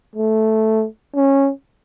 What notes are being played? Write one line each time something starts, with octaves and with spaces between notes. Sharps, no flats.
A3
C#4